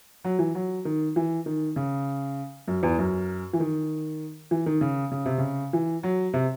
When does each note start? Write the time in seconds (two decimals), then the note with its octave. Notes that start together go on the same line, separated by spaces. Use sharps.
0.24 F#3
0.39 E3
0.55 F#3
0.85 D#3
1.16 E3
1.46 D#3
1.76 C#3
2.68 F#2
2.83 E2
2.99 F#2
3.53 E3
3.60 D#3
4.51 E3
4.66 D#3
4.81 C#3
5.12 C#3
5.26 C3
5.38 C#3
5.73 E3
6.03 F#3
6.34 C3